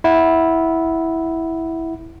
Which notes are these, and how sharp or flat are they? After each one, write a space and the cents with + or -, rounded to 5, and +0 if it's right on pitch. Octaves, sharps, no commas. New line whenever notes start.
E4 -10 F#5 +0